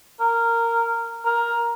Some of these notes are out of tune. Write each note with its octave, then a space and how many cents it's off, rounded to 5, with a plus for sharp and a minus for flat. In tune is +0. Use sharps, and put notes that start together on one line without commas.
A#4 -10
A#4 +10